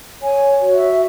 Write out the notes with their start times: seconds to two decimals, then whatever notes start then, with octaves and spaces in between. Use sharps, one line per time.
0.21 C#5 G#5
0.60 F#4
0.73 E5